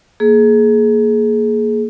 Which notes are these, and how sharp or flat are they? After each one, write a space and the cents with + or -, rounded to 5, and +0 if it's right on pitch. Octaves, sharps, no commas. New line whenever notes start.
A#3 +0 G#4 +25